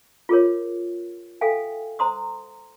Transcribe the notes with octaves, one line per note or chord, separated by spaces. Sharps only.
F4 G#4 A#4 C#5
A4 E5 F5 G5 G#5
C5 A#5 C6 D#6